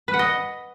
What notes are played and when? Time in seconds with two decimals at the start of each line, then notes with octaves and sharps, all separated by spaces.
0.08 B4
0.14 F#5
0.19 D#5